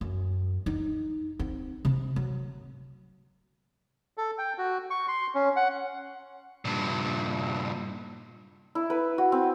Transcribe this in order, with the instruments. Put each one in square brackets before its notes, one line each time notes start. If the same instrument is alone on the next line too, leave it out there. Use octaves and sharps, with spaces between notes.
[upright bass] F#2
D#4
C4
C3
F#3
[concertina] A4
G5
F#4
C#6
C6
C#4
F#5
[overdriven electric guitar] G2 A#2
[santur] E4
B4
F#4
C4